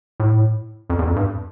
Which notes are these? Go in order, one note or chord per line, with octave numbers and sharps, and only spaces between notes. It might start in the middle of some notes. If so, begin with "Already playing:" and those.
A2
F2
E2
F2
G2